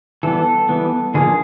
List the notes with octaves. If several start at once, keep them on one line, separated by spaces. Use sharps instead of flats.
E3 G3 B3 A4
E3 G3 B3
D3 F3 A#3 G#4